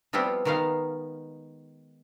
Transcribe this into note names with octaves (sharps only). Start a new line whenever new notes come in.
F3 G3 B3 C4 E4 F4
D#3 G#3 B3 D#4 F5